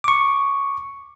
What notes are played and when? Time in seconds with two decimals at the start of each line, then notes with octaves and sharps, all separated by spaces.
0.04 C#6 D6